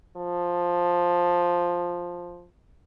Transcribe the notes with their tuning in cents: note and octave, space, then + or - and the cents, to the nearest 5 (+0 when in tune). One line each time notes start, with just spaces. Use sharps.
F3 +5